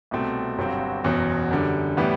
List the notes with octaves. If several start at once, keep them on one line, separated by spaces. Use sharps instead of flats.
C2 B2 A3 C4
G1 G2 F#3 C4 F#4
F#1 E2 B2 F#3
F#2 D3 G3
A2 E3 G3 B3